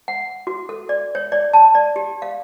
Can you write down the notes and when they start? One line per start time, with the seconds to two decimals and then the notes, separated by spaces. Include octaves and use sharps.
0.08 F#5
0.47 F#4
0.69 A4
0.89 D5
1.15 C#5
1.32 D5
1.53 A5
1.75 D5
1.96 G4
2.22 F5